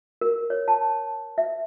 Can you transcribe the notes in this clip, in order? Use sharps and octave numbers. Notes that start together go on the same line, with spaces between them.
A#4
C#5
A5
E5